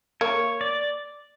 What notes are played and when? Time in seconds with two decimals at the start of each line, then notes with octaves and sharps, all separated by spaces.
0.21 A#3 C#5
0.61 D5